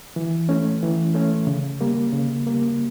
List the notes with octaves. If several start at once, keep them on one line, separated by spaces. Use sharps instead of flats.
E3
A3 C#4
E3
A3 C#4
C#3
G3 A#3
C#3
G3 A#3